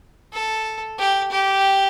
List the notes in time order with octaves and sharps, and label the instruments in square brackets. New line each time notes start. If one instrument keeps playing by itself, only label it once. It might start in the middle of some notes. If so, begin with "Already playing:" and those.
[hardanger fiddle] A4
G4
G4